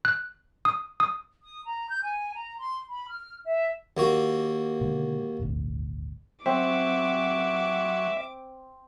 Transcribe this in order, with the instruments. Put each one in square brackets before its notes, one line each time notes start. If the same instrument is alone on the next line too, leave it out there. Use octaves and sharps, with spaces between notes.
[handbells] F#6
D#6
D#6
[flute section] D#6
A#5
G6
G#5
A#5
C6
B5
F6
E5
[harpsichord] D#2 A#3 F#4
[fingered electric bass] B2 D3 G#3
D#1 G#1 D2
[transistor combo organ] F#3 [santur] C4 [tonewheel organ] E5 [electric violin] D6